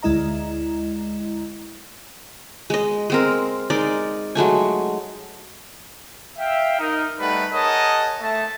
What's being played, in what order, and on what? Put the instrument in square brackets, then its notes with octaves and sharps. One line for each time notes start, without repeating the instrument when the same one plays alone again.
[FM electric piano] D2 G#3 E4 D#5 A#5
[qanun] G#3 D#5
G#3 C4 A#4
G#3 D#4 A#4 D5
F#3 G#3 A3 G#5
[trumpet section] E5 F5 G5
D#4 A#4
G3 A3 D#4 B4 F#5 B5
G#4 A#4 C#5 D#5 F#5 A5
A3 E5 A5